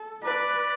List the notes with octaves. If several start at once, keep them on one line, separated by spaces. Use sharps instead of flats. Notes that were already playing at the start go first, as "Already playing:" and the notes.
Already playing: A4
B4 D5